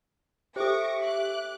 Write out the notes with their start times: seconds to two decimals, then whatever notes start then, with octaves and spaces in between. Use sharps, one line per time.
0.56 G4 A4 C5 E5 C#6 D6 A#6
1.03 D6 F#6